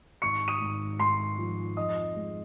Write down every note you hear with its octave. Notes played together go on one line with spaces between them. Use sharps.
G#1 C#6 C#7
D#6 D#7
G#1
G#2 C6 C7
F3
F2 D#5 D#6
G#3